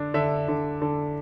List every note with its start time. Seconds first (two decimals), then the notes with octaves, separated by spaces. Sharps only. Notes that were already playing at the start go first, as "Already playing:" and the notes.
Already playing: D3 D4
0.14 D3 E5
0.48 D3
0.82 D3